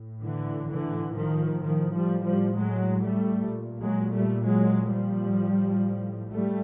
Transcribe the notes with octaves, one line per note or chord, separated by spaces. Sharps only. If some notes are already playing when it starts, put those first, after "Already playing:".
Already playing: A2
D3 E3
D3 E3
D#3 F3
A2 D#3 F3
F3 G3
F3 G3
F#3 G#3
G3 A3
A#2
F#3 G#3
G3 A3
F#3 G#3
F3 G3
A2
G3 A3